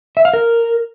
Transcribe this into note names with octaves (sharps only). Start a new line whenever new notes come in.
E5
F5
A#4